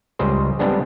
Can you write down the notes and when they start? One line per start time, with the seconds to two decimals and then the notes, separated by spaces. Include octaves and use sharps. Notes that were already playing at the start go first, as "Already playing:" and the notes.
0.19 C#2 C#3 G3 G#4 C5
0.59 G3 G#3 B3 C4 D4 G#4